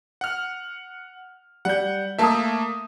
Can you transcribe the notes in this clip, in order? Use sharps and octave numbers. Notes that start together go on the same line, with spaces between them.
F#5 F6
G3 F#5 G6
A3 A#3 E5 A5 A#5 D#6